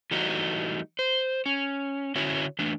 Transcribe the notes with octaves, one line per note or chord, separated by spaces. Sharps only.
E3 G3 A3 D#4 F#4
C5
C#4
D3 C#4 E4 F#4 C#5
E3 A3 D4